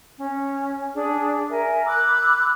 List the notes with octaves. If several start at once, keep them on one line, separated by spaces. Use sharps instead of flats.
C#4
D4 G#4
A#4 E5 G#5
B5 D6 E6 F#6